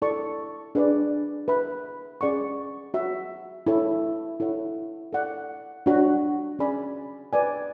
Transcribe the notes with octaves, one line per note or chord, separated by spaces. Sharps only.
E4 A4 D5 A5 C#6
D4 G#4 B4 D5
B4 E5 B5
C#4 G#4 D5 F#5 C#6
F#4 C#5 E5
E4 A4 C#5
E4 A4 C#5 F#5
A4 D5 F#5
D4 F#4 C#5
C#4 G#4 D5 G#5 B5
B4 D5 G#5